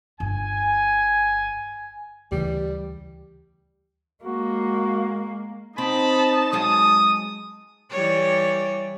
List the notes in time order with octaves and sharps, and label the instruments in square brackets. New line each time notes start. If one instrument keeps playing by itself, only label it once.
[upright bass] G1 [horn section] G#5
[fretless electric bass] D2 C#3 E3 [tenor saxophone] G3
[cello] G#3 A#3 [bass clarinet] F#4
[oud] C4 [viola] D#4 A5 [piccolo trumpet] B5
[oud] F#3 G#3 F5 [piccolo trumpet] D#6
[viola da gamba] E3 G3 C#5